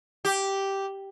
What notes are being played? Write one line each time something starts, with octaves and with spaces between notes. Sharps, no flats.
G4